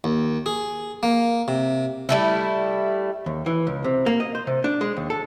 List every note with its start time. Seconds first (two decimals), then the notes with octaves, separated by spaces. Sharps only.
0.04 D#2
0.46 G#4
1.03 A#3
1.48 C3
2.09 G3 A3 E4
3.26 D#2
3.46 E3
3.67 C#2
3.84 C3
4.06 A#3
4.20 D#5
4.35 C5
4.47 C3
4.64 D4
4.81 G#3
4.97 D#2
5.10 A4